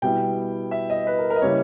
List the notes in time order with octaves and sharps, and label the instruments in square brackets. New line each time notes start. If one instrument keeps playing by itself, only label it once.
[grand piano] B2 G3 B3 E4 G5
E5
D#5
B4
A#4
A#4
D#5
C#3 G3 A#3 E4 C#5